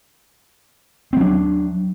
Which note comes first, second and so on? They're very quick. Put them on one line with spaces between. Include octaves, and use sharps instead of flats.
C4 F#3 D4